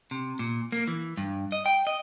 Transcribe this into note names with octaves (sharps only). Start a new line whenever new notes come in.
C3
A#2
A#3
E3
G2
D#5
G5
D#5